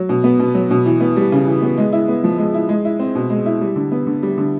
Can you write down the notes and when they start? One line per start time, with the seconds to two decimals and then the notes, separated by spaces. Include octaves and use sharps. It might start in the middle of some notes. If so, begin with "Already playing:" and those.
Already playing: F#3
0.09 B2
0.24 B3
0.40 B2
0.55 F#3
0.71 B2
0.86 E3
1.00 B3
1.17 G3
1.32 C#3
1.47 E3
1.62 B3
1.78 G#3
1.93 E4
2.08 B3
2.24 F3
2.38 G#3
2.54 E4
2.69 G#3
2.85 E4
2.99 C4
3.15 B2
3.30 G#3
3.46 E4
3.61 G3
3.76 D3
3.92 B3
4.07 D3
4.23 G3
4.38 D3